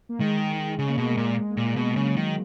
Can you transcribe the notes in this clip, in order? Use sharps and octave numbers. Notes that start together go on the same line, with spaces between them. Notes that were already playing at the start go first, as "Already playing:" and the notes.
A#3
D#3 G#3
C#3 G#3
A#3
B2 G#3
A#3
A#2 G#3
A#3
G#3
A#3
A#2 G#3
B2
C#3 F#3
D#3